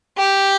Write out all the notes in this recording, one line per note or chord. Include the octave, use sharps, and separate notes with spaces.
G4